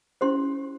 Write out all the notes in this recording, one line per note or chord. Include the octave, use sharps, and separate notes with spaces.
C#4 E4 G4 C5 C6